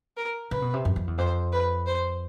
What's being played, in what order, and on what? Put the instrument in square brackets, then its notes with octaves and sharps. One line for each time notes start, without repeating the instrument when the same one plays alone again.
[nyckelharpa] A#4
[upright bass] C#3 [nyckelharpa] B4
[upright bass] B2
C3
F#2
F2
E2
[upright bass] F2 [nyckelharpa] C5
[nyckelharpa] B4
C5